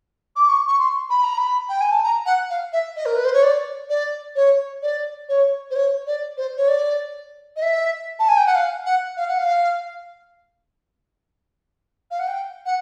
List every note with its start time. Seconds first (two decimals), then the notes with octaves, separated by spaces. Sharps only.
0.36 D6
0.48 C#6
0.67 C#6
0.78 C6
1.09 B5
1.23 A#5
1.37 B5
1.69 G5
1.80 G#5
1.91 A5
2.03 A#5
2.25 F#5
2.50 F5
2.72 E5
2.96 D#5
3.05 A#4
3.15 B4
3.24 C5
3.33 C#5
3.43 D5
3.89 D5
4.35 C#5
4.82 D5
5.28 C#5
5.70 C5
5.75 C#5
6.06 D5
6.37 C5
6.56 C#5
6.68 D5
7.56 D#5
7.62 E5
8.19 A5
8.28 G#5
8.37 G5
8.46 F#5
8.55 F5
8.85 F#5
9.16 F5
9.28 F#5
9.38 F5
12.10 F5
12.19 F#5
12.27 G5
12.65 F#5